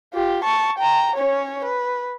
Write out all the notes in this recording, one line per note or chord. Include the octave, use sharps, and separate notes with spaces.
F4 G4
A5 C#6
G5 A#5
C#4 C#5
B4